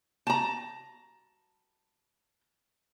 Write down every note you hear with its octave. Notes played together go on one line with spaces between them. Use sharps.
A5 A#5